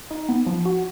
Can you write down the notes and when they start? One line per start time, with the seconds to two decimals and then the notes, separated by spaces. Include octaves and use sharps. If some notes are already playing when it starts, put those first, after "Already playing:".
0.11 D#4
0.29 B3
0.47 F3
0.65 F#4